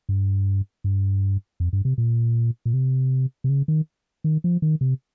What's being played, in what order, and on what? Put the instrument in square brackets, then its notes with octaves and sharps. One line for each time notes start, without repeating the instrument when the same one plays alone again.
[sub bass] G2
G2
F2
G2
C3
A#2
A#2
C3
C3
C#3
D#3
D#3
F3
D#3
C3